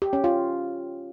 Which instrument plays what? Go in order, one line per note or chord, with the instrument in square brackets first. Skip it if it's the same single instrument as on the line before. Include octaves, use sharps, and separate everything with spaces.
[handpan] G4
C#4
F4